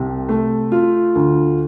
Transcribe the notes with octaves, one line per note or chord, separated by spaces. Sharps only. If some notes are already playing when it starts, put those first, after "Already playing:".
Already playing: C2 C3
A3
F4
D2